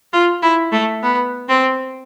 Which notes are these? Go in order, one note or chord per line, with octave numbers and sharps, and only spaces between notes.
F4
E4
A3
B3
C4